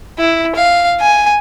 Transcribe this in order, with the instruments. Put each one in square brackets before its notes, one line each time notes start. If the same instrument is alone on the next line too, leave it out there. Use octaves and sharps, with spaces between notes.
[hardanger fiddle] E4
F5
G#5